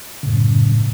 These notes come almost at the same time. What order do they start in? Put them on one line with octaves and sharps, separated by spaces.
C#3 A2 F#2